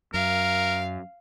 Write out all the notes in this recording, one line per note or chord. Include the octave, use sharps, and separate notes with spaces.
F#2 A#4 F5